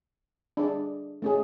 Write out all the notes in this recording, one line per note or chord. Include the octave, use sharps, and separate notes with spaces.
D4 G#4 D5
A3 C#4 G#4